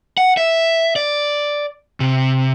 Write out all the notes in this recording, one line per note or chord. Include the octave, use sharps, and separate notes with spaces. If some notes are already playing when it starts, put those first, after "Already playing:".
F#5
E5
D5
C3